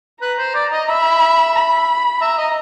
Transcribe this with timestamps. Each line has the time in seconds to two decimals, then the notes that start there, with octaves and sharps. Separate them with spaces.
0.21 B4 A#5
0.39 C5
0.55 D5
0.72 D#5
0.88 E5 B5
1.55 B5
2.21 E5 A#5
2.38 D#5